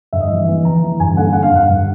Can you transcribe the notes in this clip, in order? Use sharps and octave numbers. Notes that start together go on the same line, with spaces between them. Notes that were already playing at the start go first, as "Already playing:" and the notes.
G2 E5
D#5
E3 E5
E3
E3 A#5
E3
G2 G#5
D3 F#5
D3 F#5
F5
G2 F#5
G2